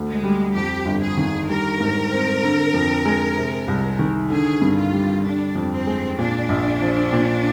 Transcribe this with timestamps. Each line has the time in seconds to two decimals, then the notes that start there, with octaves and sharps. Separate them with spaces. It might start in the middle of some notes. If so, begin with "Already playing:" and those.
Already playing: D2 D3
0.08 G#3
0.24 G3
0.55 F2 G4
0.86 G1
1.02 G#4
1.17 D#3
1.49 G3 A#4
1.80 G#2
2.11 C4
2.43 D3
2.74 F2
3.05 G#3
3.37 C3
3.68 C2
3.99 D#3
4.30 D3 G#4
4.62 G2
4.77 F4
4.93 G3
5.24 D3 D4
5.55 F2
5.71 C4
5.87 G#3
6.18 A#2 D4
6.49 A#1
6.81 F3
7.13 A#2